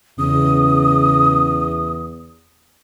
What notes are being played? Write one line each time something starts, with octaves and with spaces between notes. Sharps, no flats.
E2 C#3 D#6